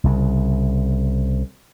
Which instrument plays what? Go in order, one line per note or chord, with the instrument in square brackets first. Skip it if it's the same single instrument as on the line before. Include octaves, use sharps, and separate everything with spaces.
[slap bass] C2 C#3